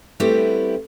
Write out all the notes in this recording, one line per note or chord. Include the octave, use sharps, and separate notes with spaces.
G3 A3 B3 C4 E4 G4